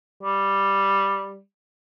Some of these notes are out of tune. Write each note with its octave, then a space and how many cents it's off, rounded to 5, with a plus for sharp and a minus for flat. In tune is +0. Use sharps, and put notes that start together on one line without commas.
G3 +0